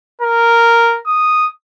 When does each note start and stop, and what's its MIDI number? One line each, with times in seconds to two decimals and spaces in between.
0.22 0.99 70
1.07 1.48 87